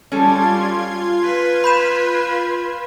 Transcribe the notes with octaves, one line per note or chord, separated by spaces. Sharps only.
G3 C#4 F4 A4 C6 G#6
B4
B5 G6 E7